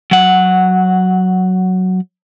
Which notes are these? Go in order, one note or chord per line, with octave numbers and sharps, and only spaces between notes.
F#3 F#5